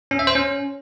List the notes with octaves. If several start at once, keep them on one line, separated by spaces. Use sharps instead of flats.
C#4
E5
C5
C#4